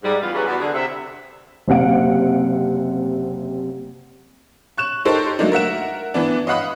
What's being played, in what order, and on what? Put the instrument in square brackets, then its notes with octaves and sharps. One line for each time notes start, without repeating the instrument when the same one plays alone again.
[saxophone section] G#2 G3
C#3 E3 B3 F4
E3 F#3 G3 C#4 G#4 B4
E2 B3 F#4
D3 G#4
C3 E5
[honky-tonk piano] F#1 C3 F5 F#5 D7
C#6 F#6 E7
D#4 G4 A4 A#4 C5 C#5
F#3 A3 A#3 D4 D#4
A#4 E5 F#5 E7
E3 B3 D4
D#5 F5 F#5 B5 D#6